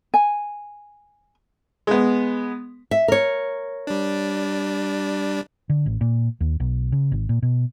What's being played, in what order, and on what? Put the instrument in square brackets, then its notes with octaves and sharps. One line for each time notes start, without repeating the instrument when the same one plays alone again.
[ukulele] G#5
[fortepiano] G#3 B3
[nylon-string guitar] E5
A#4 C#5
[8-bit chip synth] G3 D4
[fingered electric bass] D3
A1
A#2
D#2
B1
C#3
G#1
A#2
B2